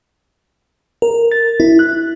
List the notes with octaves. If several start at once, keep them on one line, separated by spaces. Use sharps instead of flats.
A#4
A6
E4
F#6